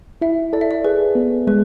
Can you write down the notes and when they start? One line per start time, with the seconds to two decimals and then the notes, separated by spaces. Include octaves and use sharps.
0.21 E4 E5
0.53 A4 D5
0.61 E5
0.71 D5
0.84 G#4 B4
1.15 B3
1.47 G#3 B4